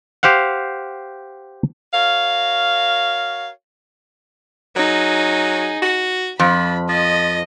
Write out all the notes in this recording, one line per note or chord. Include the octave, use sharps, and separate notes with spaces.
G4 C5 F5 F#5
F#4 A#4 C#5 F5
F#3 D#4 G#4
F#4
F2 F3 B5
F3 D#5